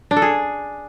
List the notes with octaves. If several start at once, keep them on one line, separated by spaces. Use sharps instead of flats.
D4
A4
G#4